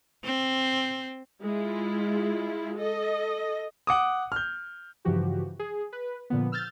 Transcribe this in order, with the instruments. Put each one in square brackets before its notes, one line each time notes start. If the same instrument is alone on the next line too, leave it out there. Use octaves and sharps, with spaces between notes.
[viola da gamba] C4
[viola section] G#3 E4 F4
A4 D#5
[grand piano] F#5 D6 D#6
F6 G6
[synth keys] G2 C#3 E3 F3 F#4 G4
G#4
B4
A#2 D3 F3 B3
E6 F6 G6 A6